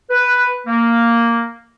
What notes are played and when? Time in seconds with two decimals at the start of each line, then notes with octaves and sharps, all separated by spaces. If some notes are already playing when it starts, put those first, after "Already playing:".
0.10 B4
0.66 A#3